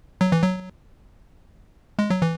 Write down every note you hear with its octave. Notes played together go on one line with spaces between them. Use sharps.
F#3
E3
F#3
G#3
F#3
E3